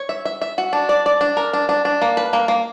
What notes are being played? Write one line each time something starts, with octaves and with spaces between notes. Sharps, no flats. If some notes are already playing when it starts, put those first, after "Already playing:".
Already playing: C#5
E5
E5
E5
F#4
D4
D5
D5
D4
A#4
D4
D4
D4
A#3
B4
A#3
A#3